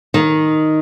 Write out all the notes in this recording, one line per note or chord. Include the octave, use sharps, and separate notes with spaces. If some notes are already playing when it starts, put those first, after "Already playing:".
D#3